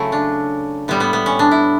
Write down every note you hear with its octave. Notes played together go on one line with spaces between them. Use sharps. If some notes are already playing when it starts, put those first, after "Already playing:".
Already playing: C#3 F#3 A3 E4
D4
A2 G3 B3
B3
B3
C#4
D4
E4